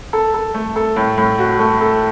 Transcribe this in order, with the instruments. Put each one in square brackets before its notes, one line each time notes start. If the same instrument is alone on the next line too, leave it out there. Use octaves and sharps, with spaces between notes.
[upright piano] A4
A4
A3
A4
A2
A2
F#4
A3
A4